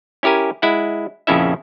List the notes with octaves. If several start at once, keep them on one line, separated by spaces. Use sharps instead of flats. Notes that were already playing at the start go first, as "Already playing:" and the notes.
C#4 E4 G4 A#4 G#5
G#3 E4 F#5
A#1 F2 C#3 C#4 E4 E5